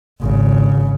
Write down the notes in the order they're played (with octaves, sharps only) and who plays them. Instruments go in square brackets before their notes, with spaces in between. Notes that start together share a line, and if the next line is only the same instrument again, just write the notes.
[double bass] G#1 C#3